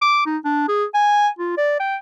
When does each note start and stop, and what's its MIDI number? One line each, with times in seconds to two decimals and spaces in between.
0.02 0.24 86
0.26 0.37 63
0.45 0.67 62
0.68 0.85 68
0.94 1.28 80
1.39 1.56 65
1.57 1.77 74
1.80 1.96 79